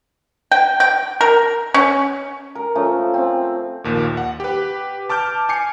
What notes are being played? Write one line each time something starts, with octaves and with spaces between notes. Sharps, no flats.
G5
G5
A#4
C#4
A#4
F3 A3 C#4
C4
A#1 D#2 A#2
F#5
G4 B4
A5 D6 F6 G6
G#5 D6 C7 C#7